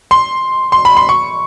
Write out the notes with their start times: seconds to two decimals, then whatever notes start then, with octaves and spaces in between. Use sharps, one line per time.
0.11 C6
0.72 C6
0.85 B5
0.97 C6
1.09 C#6